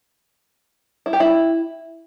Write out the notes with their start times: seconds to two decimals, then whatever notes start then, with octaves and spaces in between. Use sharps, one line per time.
1.06 E4
1.13 G4
1.20 E4